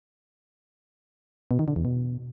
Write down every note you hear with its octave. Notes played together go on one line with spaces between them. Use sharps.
B2
D#3
D3
E2
B2